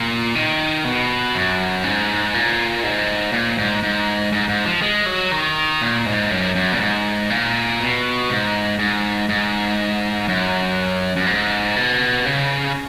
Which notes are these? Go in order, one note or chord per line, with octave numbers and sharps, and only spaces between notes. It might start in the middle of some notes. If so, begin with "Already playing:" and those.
Already playing: A#2
D#3
B2
F#2
G#2
A#2
G#2
A#2
G#2
G#2
G#2
G#2
F3
G#3
F#3
D#3
A#2
G#2
F#2
F#2
A#2
G#2
A#2
B2
G#2
G#2
G#2
F#2
F#2
G#2
B2
C#3